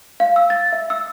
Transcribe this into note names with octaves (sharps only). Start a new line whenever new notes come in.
F5
E6
A6
E5
E6